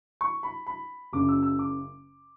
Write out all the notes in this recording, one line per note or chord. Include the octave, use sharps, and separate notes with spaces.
C#6
B5
B5
F#1 F#2 C#3 D6
E6
E6
D6